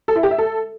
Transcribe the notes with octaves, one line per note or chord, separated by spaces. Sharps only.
A4
E4
G4
E5
A4